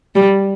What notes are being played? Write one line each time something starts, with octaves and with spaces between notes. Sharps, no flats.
G3